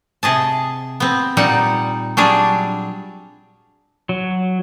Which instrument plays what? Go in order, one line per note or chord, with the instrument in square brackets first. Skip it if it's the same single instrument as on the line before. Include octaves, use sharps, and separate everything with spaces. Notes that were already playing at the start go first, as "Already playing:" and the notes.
[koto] C3 G#4 D#5 A5
B3 C4
A#2 G3 D#4 F#5
F#3 G3 D4 G#4
[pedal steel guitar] F#3